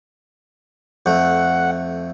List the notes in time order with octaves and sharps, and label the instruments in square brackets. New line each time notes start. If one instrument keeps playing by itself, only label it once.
[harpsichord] F2 A3 [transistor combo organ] F#5